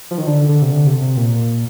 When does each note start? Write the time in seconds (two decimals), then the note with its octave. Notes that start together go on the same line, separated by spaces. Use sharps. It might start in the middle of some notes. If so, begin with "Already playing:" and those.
0.11 F3
0.18 D#3
0.26 D3
0.49 D3
0.62 C3
0.72 D3
0.87 C3
1.01 C3
1.17 A#2